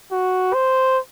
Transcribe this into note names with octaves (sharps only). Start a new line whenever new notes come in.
F#4
C5